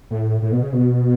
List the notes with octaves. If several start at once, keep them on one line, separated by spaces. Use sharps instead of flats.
A2
A2
B2
C#3
B2